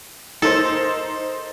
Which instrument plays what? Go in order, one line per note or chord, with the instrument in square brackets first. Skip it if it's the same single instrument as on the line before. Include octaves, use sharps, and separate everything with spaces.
[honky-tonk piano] D#4 A#4 C5 [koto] A4